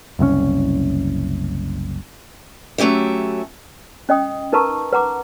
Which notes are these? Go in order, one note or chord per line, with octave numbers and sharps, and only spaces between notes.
F#1 C2 A2 C#4
F#3 A3 C#4 G4 E5
C#4 D#5 G5 D#6
D#4 A#4 B4 A5 A#5 C#6
B4 F#5 A#5 D6